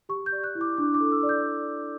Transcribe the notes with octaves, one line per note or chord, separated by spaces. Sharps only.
G4 C#6
G6
D5
F#6
E4
D6
D4 D6
D6
A4
E6
D5
G6